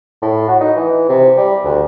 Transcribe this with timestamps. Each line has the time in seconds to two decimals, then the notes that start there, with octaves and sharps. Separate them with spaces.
0.22 A2
0.48 F#4
0.61 D#4
0.76 E3
1.09 C3
1.37 G3
1.65 D2